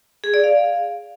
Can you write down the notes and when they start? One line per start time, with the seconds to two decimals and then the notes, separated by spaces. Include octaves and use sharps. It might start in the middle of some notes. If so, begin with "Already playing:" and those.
0.24 G#4
0.34 D5
0.44 F5